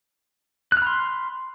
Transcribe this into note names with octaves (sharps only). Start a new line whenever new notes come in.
B5 C6 F6 F#6